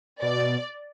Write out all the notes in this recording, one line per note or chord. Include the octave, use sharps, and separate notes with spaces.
B2 D5